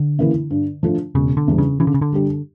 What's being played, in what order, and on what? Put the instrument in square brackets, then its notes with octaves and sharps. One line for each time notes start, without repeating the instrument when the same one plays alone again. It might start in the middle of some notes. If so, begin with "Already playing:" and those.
Already playing: [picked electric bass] D3
[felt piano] C#3 E3 A#3 E4
G2
F3 A3 D4 F4
[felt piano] E1 [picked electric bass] C#3
[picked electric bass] D3
[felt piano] E2 E3 G3 D4
[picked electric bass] C#3
[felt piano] C#3 [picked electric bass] E3
[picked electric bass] D3
C#3
D3
[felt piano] G3 D4 G4